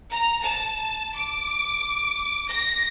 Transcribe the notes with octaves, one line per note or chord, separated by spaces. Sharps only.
A#5
A5
D6
A#6